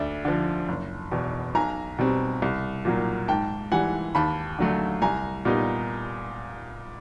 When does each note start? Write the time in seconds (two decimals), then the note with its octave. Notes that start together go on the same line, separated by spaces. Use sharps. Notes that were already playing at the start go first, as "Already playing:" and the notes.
Already playing: D2 D5 E5
0.25 D3 F3
0.68 F#1
1.12 E2 B2
1.55 B1 G#5 A#5
1.98 B2 G3 C4
2.42 C2
2.85 A#2 F#3 A#3
3.28 G#2 G5 A5
3.72 E3 G3 F#5 G#5
4.15 D#2 A5 B5
4.59 D3 F#3 A3
5.02 C2 G#5 A#5
5.45 A#2 G3 B3 D#4